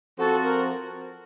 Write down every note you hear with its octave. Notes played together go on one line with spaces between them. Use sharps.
F3 C4 F#4 A4
A#4